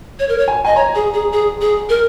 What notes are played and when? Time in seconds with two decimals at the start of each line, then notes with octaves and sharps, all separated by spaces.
0.19 C#5
0.29 A#4
0.38 C#5
0.48 G#5
0.65 D#5 G#5
0.76 C#5 A#5
0.95 G#4
1.14 G#4
1.33 G#4
1.61 G#4
1.89 A#4